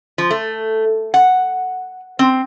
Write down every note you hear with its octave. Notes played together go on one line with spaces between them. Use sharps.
F3
A3
F#5
C4